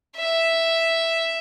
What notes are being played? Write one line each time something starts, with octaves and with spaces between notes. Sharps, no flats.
E5